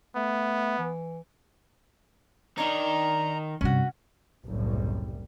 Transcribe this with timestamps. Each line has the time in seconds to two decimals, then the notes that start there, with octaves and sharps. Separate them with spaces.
0.16 A3 B3
0.79 E3
2.58 D#3 D4 D#4 C#5 A#5
3.61 G2 C3 C#4 F#4
4.44 F#1 C2 F#2 A2 G3